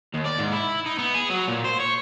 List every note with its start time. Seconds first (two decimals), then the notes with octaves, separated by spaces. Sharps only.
0.14 D#2
0.25 D5
0.38 G#2
0.52 E4
0.86 D#4
0.99 B3
1.15 G#4
1.30 F#3
1.48 A#2
1.65 C5
1.80 C#5